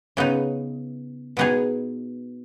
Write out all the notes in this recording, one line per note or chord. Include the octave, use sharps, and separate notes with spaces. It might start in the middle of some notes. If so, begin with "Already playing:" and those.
C#3 B3 D#4
B2 B3 D#4 G#4